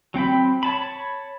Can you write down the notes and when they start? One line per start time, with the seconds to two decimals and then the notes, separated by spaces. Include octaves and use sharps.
0.14 F#3 C4 G5 B5
0.63 C#5 A5 B5